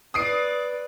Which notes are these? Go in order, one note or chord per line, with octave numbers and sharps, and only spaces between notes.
B4 D5 D#6 C7 D7